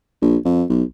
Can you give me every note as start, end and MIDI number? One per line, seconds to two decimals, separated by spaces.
0.22 0.37 34
0.45 0.64 41
0.69 0.83 35